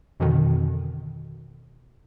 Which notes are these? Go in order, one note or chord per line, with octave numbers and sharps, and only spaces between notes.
F2 B2 D3 D#3